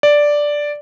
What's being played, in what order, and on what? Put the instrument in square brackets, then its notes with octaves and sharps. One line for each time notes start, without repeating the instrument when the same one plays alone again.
[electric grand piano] D5